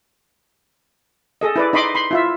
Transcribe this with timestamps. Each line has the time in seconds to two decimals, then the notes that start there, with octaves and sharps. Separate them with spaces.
1.41 G#4 A4 D#5
1.56 E4 B4 D5
1.73 D#4 D#5 B5 C6 D6
1.95 B5 C6
2.11 E4 F4 E5